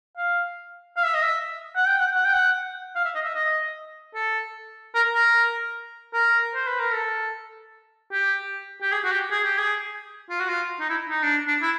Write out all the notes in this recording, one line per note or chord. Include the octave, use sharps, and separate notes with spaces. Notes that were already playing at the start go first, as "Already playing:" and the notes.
F5
F5
E5
D#5
E5
F#5
G5
F#5
F#5
G5
F#5
F5
E5
D#5
E5
D#5
A4
A#4
A#4
A#4
C5
B4
A#4
A4
G4
G4
G#4
F#4
G4
G#4
G4
G#4
F4
F#4
F4
D#4
E4
D#4
D4
D4
E4